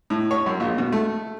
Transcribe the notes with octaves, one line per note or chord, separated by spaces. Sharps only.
A2
C#5
F#2
A#1
B2
A3